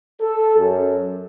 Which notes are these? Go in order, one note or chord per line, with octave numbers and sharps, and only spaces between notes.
A4
F#2